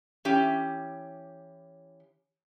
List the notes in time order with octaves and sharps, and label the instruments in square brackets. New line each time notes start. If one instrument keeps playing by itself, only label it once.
[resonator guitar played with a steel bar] E3 C#4 G4